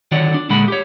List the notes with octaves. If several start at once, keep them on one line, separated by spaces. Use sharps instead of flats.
D3 D#3 F#4 C#5 D5 F#5
D4
A#2 D3 G#3 F#5 B5
G4 C#5